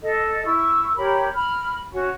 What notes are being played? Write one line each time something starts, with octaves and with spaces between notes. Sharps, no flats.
A4 D#5
E4 C#6 E6
G4 A#4 C#5 B5
B5 F6
C#4 F#4 C#6